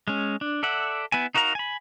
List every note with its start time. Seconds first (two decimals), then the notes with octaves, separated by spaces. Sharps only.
0.08 G#3 C#4
0.41 D4
0.63 A4 D5 E5 F#5
1.12 B3 E4 G#5
1.35 D#4 F#4 A#4 F5 A#5
1.55 G#5 B5